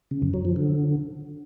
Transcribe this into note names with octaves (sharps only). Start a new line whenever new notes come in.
C#3
F#2
F#3
F3
D3